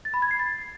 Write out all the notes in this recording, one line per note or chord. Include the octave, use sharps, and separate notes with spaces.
A6
B5
G#6
C7
A6